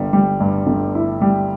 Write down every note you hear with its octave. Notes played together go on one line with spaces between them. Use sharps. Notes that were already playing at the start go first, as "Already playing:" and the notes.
Already playing: G1 G3
G3
G2
G1
E4
G3